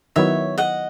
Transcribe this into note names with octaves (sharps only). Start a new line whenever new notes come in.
D#3 F#3 B3 E4 C#5 E5
D#5 F#5